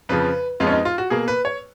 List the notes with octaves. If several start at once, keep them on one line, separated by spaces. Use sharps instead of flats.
F2 C#3 F3 B4
F2 F3 G#3 B3 F4
C#4
D#4
F4
F#4
B2 A#3 G#4
B4
C#5